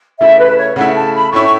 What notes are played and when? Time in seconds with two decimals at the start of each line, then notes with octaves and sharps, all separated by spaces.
0.20 C#3 A3 E4 E5
0.39 B4
0.57 C#5
0.76 C#3 A3 E4 F#5
0.95 A5
1.14 B5
1.32 A2 A3 C#4 E4 C#6
1.44 C#6